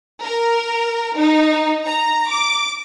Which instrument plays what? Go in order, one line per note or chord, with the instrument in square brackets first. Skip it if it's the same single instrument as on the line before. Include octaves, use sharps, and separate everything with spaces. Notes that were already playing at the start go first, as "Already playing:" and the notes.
[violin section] A#4
D#4
A#5
D6